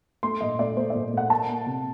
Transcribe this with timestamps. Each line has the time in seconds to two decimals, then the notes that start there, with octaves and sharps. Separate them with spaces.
0.23 A3 C6
0.41 A#2 D#5
0.59 A3 D5
0.77 A3 C5
0.90 A#2 D5
1.13 A3 F#5
1.30 A#3 A5
1.49 A#3
1.66 C3